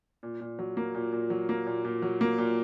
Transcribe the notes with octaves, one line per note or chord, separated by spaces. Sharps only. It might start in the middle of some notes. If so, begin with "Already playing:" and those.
A#2
A#2
F#3
A#3
A#2
A#2
F#3
A#3
A#2
A#2
F#3
A#3
A#2